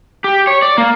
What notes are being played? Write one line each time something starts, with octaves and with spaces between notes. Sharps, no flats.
G4
C#5
D5
A#3